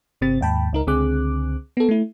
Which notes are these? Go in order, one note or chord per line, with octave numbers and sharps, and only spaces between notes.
G1 C3 C4 A6
D#2 G#2 G5 A5 B5
C#2 D#4 A#4
C#2 D3 C4 G#4 D6 F#6
B3 A4
A3 E4